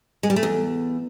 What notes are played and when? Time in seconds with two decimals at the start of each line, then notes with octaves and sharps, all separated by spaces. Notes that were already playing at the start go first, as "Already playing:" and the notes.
0.23 G#3
0.30 G3
0.36 A3
0.43 E2